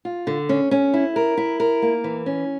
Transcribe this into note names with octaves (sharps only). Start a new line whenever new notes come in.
F4
D3
C#4
C#4
E4
A#4
E4
A#4
A#3
E3
C#4